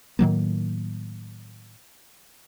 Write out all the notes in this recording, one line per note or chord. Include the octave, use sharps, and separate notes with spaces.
A2 D#3 F#3 A#3